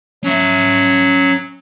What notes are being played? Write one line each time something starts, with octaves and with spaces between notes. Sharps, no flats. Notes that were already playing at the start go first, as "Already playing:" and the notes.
F#3 C#4 E5